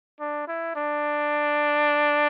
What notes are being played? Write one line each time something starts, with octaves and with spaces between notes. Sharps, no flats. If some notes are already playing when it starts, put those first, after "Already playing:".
D4
E4
D4